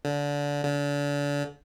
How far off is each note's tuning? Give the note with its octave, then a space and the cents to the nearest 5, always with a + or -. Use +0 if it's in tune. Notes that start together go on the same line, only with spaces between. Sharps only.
D3 -25
D3 -35